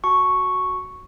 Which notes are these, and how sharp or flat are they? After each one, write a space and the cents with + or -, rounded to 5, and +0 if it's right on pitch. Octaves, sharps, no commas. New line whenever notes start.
F#4 +0 A5 +0 C#6 +0